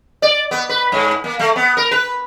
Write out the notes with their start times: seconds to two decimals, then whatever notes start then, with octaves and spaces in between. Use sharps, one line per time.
0.22 D5
0.51 B3
0.69 B4
0.92 G#2
1.24 A#3
1.39 A3
1.56 B3
1.77 A#4
1.91 B4